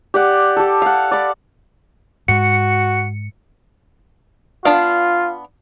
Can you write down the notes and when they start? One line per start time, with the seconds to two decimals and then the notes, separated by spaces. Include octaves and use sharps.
0.14 G4 D5 F#5
0.57 G4 A4
0.82 F5 F#5
1.11 D5 B5
2.28 G#2 G#3 F#4 C#7
4.65 B3 D4 F4 F5